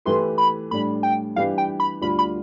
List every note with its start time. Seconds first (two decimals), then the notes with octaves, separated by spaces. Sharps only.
0.05 E3 A3 E4 G4 B4 C6
0.38 B5
0.71 A2 G3 D4 B5
1.03 G5
1.36 E3 G3 D4 G4 B4 F5
1.58 G5
1.80 B5
2.01 D2 D3 G3 D4 F4 B5
2.19 B5